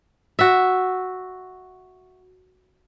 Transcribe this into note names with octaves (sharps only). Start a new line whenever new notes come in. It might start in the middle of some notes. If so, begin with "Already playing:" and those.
F#4 E5